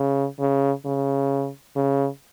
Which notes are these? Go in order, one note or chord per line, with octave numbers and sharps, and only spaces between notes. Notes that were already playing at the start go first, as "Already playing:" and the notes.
Already playing: C#3
C#3
C#3
C#3